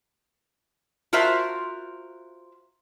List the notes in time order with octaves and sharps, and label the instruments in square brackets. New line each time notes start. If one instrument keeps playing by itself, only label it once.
[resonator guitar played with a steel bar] F4 F#4 A#4 C5 E5